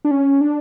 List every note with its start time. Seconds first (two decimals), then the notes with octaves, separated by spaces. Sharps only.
0.05 D4
0.11 C#4
0.41 D4